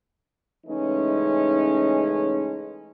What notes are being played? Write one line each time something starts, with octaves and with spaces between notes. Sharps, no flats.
C#3 E3 G#3 A3 C#4 D#4